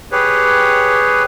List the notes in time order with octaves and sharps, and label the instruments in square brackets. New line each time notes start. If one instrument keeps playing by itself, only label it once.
[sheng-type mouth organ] G4 G#4 B4 C#5